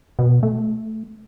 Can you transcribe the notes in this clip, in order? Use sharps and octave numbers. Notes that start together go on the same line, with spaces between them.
B2
A3